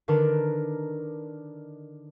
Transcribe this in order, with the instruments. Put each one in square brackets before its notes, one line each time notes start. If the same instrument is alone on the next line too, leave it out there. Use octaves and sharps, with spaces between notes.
[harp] D3 D#3 D4 A#4 B4